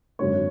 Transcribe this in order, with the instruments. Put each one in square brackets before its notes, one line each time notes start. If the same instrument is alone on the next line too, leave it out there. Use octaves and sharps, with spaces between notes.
[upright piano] G#1 F#2 D3 C#5